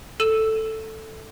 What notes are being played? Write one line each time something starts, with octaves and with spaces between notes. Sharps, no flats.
A4 E6 D#7 E7